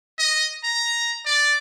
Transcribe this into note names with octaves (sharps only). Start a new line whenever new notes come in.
D#5
A#5
D5